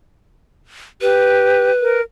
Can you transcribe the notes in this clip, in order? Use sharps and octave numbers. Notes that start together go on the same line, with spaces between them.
G4 B4
A#4